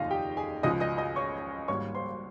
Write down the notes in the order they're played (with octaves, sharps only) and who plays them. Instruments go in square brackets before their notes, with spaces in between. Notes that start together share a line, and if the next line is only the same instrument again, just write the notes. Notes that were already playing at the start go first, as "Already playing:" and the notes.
Already playing: [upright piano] F1 D#2 C#3 D#4 F4 D#5 F5
G4 G5
G#4 G#5
C#2 C#3 F3 G#3 D#5 D#6
D#5 D#6
D#5 D#6
C#5 C#6
G#1 G#2 G3 A#3 C#5 C#6
C5 C6